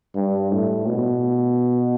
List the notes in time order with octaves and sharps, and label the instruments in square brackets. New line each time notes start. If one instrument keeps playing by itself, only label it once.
[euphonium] G2
A2
B2